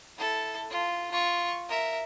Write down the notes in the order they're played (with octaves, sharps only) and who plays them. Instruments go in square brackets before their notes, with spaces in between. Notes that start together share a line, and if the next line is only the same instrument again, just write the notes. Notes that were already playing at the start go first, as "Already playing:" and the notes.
[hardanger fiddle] E4 A4
F4
F4 C#6
A#4 E5